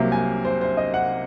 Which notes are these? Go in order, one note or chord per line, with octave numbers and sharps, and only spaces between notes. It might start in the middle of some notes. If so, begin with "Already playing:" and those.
Already playing: C2 C3 F#3 A#3
G#5
C5
C5
D#5
F#5